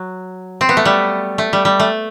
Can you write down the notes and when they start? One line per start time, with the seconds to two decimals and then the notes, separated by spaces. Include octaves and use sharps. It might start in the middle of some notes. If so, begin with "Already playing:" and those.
Already playing: F#3
0.61 C4
0.69 B3
0.77 A3
0.85 G3
1.38 A3
1.53 G3
1.65 G3
1.80 A3